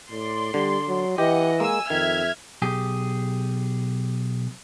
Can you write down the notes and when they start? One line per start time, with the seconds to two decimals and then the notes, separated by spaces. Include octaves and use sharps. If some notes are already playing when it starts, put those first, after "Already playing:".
0.11 A2 D5 C6
0.54 D3 G3
0.88 F#3
1.18 E3 G4 D#5 F#5
1.60 G#3 A#3 G#5 E6
1.90 F2 D#3 E5 F6 G#6
2.62 B1 G4 G#4